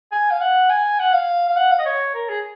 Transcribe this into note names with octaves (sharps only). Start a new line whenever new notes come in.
G#5
F5
F#5
G#5
F#5
F5
F5
F#5
F5
D#5
C#5
A#4
G#4